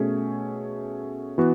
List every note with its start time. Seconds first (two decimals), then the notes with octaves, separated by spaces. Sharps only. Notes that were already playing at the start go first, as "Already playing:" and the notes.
Already playing: B2 A3 C#4 G#4
1.38 E3 B3 F#4